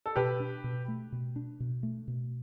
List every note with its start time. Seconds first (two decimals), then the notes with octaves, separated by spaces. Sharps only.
0.06 A4
0.16 B2 G4 B4
0.40 D4
0.64 B2
0.88 A3
1.12 B2
1.36 D4
1.60 B2
1.83 A3
2.08 B2